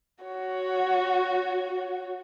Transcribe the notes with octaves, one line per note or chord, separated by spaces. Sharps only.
F#4 C#5